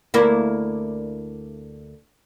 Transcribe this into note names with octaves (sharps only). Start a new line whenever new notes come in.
D2 A#3 E4